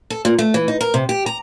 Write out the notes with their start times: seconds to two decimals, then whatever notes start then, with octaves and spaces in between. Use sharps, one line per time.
0.10 A4
0.25 A#2
0.39 A3
0.54 E3
0.68 D#4
0.81 A#4
0.94 C3
1.09 G4
1.26 A#5